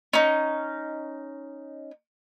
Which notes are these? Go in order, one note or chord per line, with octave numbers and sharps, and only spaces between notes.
C#4 D#4